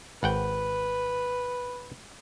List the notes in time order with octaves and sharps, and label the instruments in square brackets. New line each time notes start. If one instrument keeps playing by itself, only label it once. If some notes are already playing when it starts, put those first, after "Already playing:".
[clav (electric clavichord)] G#1 F#5 G5 [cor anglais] B4